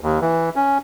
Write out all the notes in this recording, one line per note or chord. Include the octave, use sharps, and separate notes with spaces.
D#2
E3
C#4